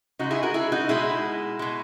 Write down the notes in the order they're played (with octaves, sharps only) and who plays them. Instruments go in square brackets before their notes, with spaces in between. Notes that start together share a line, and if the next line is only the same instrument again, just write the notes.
[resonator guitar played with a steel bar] C#3 G#3 D#4 F#4
E4 G#4
F#4 A#4
E4 G#4
D#4 F#4
B2 G#3 E4 G#4
B2 G#3